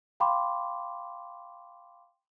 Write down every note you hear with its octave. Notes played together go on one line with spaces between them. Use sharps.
F5 G5 B5 C6 D6